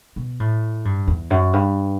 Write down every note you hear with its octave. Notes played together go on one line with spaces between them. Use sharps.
B2
A2
G2
E2
F#2
G2